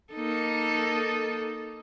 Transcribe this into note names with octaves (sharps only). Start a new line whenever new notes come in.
A#3 D#4 A4